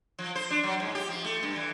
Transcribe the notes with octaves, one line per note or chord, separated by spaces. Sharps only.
F3
C5
D4
F#3
G#2
G4
F3
A3
G2
E3